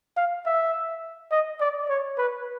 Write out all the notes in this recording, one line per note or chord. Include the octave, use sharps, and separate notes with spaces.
F5
E5
D#5
D5
C#5
B4